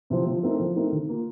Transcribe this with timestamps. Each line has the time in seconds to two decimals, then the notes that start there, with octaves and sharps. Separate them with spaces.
0.10 C3 F3 C4
0.26 F3
0.43 A3 C4 D#4 A#4
0.60 F3
0.76 A3 C4 D#4 A#4
0.92 D#3
1.09 A#3 F4